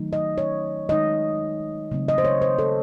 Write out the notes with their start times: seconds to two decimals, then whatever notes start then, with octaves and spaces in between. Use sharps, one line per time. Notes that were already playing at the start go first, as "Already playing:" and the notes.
Already playing: D#3 F#3 A3 D#4
0.13 D#5
0.38 C#5
0.89 D#3 G#3 D#4 D#5
1.91 C#3 F#3 A3 C4
2.08 D#5
2.18 C5
2.25 C#5
2.42 C5
2.59 A4